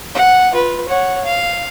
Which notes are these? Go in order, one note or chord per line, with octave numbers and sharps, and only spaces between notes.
F#5
F4 B4
C#5 F#5
F5